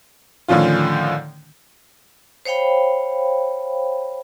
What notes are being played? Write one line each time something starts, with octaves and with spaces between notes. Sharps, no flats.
A2 D3 D#3 F3 C#4 F4
C5 C#5 F5 G5 B5